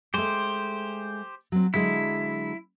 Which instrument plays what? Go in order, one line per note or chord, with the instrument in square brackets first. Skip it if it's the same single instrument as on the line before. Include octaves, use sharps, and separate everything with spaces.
[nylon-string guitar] G#3 A3 [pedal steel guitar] G4 C5
[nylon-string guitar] F#3 C4
[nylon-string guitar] D3 F#3 G#3 [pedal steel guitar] E4